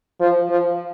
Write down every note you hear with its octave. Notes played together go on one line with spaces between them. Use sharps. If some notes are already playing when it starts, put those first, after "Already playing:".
F3
F3